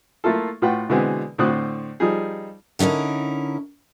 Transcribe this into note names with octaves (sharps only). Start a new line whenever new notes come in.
A3 A#3 E4 F4 A4
A2 F4 F#4 B4 F#5 G5
B2 D3 E3 G#3 B3 C4
A2 D3 C4 C5 D#6 F#6
F3 G3 D#4 G#4
D3 C#4 D#4 E4 A#4